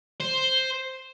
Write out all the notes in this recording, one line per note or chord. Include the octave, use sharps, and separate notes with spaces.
C5